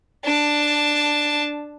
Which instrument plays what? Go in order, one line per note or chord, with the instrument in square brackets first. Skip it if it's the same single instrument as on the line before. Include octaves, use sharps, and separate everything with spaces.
[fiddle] D4 A5